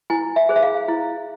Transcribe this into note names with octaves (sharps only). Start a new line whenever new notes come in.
E4 G#5
E5
G#4 C5
E5
F5
E4